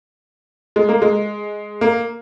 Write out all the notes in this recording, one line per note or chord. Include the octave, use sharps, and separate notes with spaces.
G#3
A#3
G#3
A#3